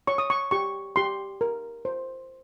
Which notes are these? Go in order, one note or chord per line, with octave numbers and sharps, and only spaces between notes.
C#5 C#6
D#6
C#6
G4 C#6
G4 C6
A#4
C5